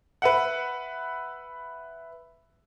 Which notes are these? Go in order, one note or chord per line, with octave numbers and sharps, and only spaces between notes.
B4 E5 F#5